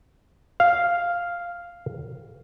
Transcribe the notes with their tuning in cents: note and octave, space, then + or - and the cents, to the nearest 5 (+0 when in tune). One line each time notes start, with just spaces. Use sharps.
F5 +0